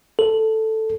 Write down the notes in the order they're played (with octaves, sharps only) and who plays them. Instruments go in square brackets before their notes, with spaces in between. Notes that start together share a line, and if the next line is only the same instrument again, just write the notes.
[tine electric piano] A4